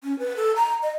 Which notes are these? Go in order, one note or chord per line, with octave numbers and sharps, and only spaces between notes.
C#4
B4
A4
A#5
D#5